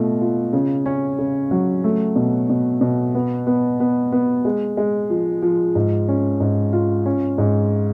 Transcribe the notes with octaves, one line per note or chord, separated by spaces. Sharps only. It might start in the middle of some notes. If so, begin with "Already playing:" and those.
Already playing: B2 A3 F4
F4
C#3
C#4
C#3
F#3
A3
B2
B2
B2
B3
B3
B3
B3
G#3
G#3
F3
F3
G#2
C#4
G#2
F4
C#4
G#2